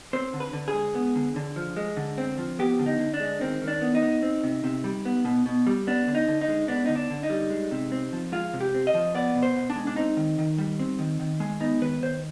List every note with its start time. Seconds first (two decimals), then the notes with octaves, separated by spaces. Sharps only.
0.13 C4 C5
0.33 D3
0.40 B4
0.53 D3
0.68 G#4
0.74 G#3
0.95 B3
1.16 D3
1.36 D3
1.56 F3
1.76 G#3
1.97 D3
2.18 C4
2.38 F3
2.59 B3 G4
2.79 D3
2.86 D#4
3.00 D3
3.14 D4
3.20 G#3
3.40 D#3 C4
3.62 D#3
3.67 D4
3.81 B3
3.95 D#4
4.02 B3
4.23 C4
4.44 C3
4.64 C3
4.84 G3
5.05 B3
5.25 B2
5.46 B2
5.67 G3
5.87 B3 D4
6.07 D3
6.15 D#4
6.28 D3
6.41 D#4
6.48 G#3
6.68 B3 D4
6.86 D3 D#4
6.96 D4
7.10 D3
7.23 D#4
7.30 G3
7.50 G#3
7.71 C3
7.92 C4
8.13 F3
8.32 G#3 F4
8.53 C3
8.60 G4
8.74 C4
8.87 D#5
8.94 F3
9.15 B3 D5
9.35 B2
9.43 C5
9.56 B2
9.70 D4
9.76 G#3
9.87 D4
9.96 C4 D#4
10.17 D#3
10.38 D#3
10.58 G3
10.79 C4
10.99 D#3
11.20 D#3
11.40 G#3
11.60 B3 D#4
11.81 D#3 B4
12.02 D#3 C5